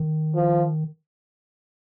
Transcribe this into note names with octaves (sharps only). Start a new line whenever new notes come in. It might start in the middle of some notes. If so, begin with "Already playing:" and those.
Already playing: D#3
F3